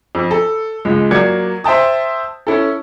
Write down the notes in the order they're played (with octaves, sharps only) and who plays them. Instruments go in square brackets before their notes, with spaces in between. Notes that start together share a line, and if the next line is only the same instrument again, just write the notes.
[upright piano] F2
A4
C#2 G#3
F#3 A#3 D5 G#6 C#7
C5 E5 G5 A5 D#6
C#4 E4 A4